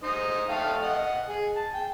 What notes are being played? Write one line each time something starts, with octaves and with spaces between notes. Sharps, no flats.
D#4 C5 D#5
A3 F5 G5
D#5 F#5
G#4
A5
G5